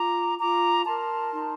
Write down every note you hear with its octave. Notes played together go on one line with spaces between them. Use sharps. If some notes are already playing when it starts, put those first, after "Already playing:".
Already playing: F4 A#5 D6
F4 A#5 D6
A#4 A5 C6
D#4